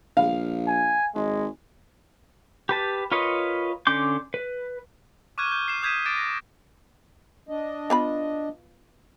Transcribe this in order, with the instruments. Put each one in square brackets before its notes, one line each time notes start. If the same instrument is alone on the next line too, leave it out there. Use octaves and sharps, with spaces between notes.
[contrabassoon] A#1 [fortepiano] F5
[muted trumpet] G#5
[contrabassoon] G#1 [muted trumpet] G#3
[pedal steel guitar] G4 B4 A5
F4 A#4 B4 C#5 D#5
D3 C#4 C6 D6 G6
B4
[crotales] C#6 D6 F6 F#6 G#6 D#7
G6
C7 E7
D#6 G6 G#6 B6 D#7 E7
D6 A6 D7
A#6
[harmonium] D4 D#5
[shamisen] B3 F4 B5